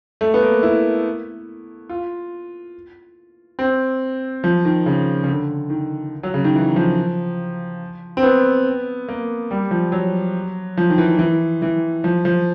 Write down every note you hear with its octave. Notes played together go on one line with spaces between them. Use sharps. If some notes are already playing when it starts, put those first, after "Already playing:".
A3
B3
A#3
E4
F4
C4
F3
D#3
C#3
C#3
D3
D#3
F#3
C#3
D#3
E3
F3
C4
B3
A#3
G3
F3
F#3
F3
D#3
E3
E3
E3
F3
F3